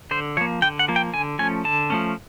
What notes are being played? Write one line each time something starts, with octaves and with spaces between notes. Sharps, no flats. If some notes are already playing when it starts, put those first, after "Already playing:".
D3 C5
F3 A#3 C#5
D3 G5
F#5
F3 A#3
G5
D3 G#5
F3 A3 C#4 G#5
D3 A5
F3 A3 C#4